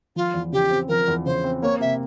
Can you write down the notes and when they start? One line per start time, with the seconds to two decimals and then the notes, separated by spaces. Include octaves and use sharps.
0.16 F3 F4
0.34 E2
0.52 C#3 G4
0.70 C4
0.89 F3 A#4
1.08 E2
1.26 C#3 C5
1.44 C4
1.62 A#3 C#5
1.80 C3 E5